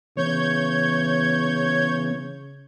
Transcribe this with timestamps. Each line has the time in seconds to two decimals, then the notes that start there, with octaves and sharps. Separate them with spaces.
0.17 C#3 E3 B3 C#5 G6 G#6